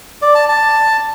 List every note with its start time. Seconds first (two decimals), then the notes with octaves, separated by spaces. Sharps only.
0.22 D5
0.35 A5
0.49 A5